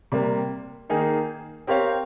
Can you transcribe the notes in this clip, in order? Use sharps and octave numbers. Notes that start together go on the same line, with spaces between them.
C3 G3 A#3
D#3 A#3 D#4 G#4
C4 G4 A#4 C#5 F5